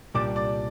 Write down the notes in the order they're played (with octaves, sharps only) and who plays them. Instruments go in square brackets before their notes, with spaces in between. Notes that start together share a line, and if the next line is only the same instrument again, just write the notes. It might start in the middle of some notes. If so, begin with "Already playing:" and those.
[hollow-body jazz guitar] C2 A#2 G3 D4 G4 [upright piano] D5 D6
[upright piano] D5 D6